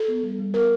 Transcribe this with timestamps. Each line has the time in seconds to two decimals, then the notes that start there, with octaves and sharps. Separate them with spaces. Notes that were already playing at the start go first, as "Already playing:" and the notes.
Already playing: A4
0.08 B3
0.23 G3
0.39 G3
0.53 B3 A#4